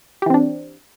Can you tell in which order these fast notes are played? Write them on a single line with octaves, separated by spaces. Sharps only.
G4 E3 C4 D4